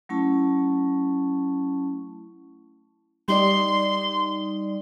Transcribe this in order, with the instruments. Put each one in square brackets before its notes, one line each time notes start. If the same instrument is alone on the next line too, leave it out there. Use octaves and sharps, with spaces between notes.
[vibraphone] F#3 A3 C#4 E4 A5 C#6
[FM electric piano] G3 D#4 D5 [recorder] C6